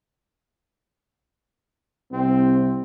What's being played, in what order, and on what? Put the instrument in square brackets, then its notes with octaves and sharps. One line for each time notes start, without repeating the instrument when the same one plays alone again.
[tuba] C2 [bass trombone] C4